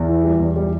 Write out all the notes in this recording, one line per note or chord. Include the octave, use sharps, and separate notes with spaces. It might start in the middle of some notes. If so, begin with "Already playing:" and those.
Already playing: E2
E3
G3
E2
G3